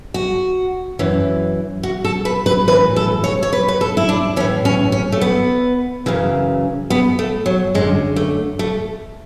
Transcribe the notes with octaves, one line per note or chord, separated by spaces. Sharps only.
F#4
F#2 E3
F#4
A4
B4
B4
A2 E3 B4
A4
C#5
C#5
B4
B4
A4
E4
D4
A2 E3 C#4
C#4
C#4
A3
B3
F#2 C#3 E3
B3
A3
F#3
F#2 D3 G#3
A3
A3